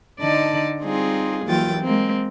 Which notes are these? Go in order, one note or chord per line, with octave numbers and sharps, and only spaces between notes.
D3 D#4 D5 D#5 A5
G3 C4 D#4 F4 G#4
D#2 E3 F#3 F4 G5 A6
G#3 A#3 C4